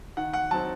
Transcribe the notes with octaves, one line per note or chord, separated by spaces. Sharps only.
D#3 F#5
F#5
F#3 C4 D#4 A5